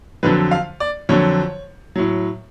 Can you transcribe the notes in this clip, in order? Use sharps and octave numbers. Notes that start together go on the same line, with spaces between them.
F2 D3 F#3 B4
F5
D5
F2 D3 F#3 C#5
A2 F#3